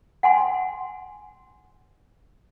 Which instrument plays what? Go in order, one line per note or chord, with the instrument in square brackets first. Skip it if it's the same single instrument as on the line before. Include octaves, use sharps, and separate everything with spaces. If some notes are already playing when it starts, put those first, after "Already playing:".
[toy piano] F#5 G#5 C6